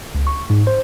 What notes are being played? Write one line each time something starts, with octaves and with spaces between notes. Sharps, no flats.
C#2
C#6
G#2
C5